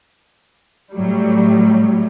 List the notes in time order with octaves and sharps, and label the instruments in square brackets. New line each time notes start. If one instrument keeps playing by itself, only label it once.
[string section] A2 F#3 G3